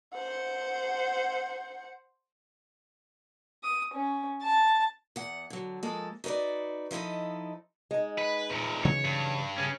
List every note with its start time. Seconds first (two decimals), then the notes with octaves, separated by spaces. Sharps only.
0.15 C5 F#5
3.64 D#6
3.94 C#4
4.42 A5
5.16 E2 F#5
5.50 D3 F#3
5.83 F3 G#3 A#3 A4
6.24 D#4 F#4 A#4 B4 D5
6.91 F3 D#4 E4 A4 D#5
7.91 G#3 D#4
8.18 B4
8.50 E2 A#2
8.85 C#3 E3 F#3 C#5
9.05 G2
9.58 C#4 G#4